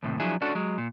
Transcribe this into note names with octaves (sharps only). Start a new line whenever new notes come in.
D#2 A2 C3
F3 F#3 D4 E4 G#4
C#4 D4 F#4 A4
F#3 G#3
A#2